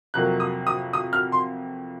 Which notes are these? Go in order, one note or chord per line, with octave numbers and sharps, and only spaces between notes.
F2 C3 F#3 A#3 F#6
D#6
D#6
D#6
F6
C6